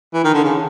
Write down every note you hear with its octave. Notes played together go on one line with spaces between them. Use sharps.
E3
D#3
D3
C#3